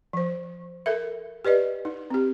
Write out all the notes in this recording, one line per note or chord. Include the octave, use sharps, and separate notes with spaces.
F3 C5
A4 A#4 E5
G4 B4 D5 D#5
D#4
C4 G4